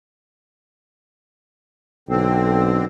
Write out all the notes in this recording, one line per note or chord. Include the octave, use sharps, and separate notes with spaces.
B1 D3 C4